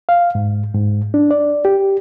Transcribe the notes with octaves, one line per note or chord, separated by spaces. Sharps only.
F5
G#2
G#2
D4
D5
G4